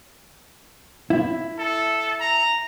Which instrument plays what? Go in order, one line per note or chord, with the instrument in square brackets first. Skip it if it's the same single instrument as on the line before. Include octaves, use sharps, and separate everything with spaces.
[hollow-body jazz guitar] E4
[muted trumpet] A4
A#5